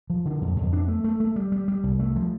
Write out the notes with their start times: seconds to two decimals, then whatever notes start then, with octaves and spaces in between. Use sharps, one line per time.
0.10 F3
0.25 D3
0.41 F2
0.57 F2
0.73 D4
0.88 A3
1.04 A3
1.20 A3
1.36 G3
1.52 G3
1.68 G3
1.83 C2
2.00 A3
2.16 F3